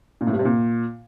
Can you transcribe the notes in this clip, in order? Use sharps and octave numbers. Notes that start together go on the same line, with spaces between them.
A#2
A2
G2
C3
A#2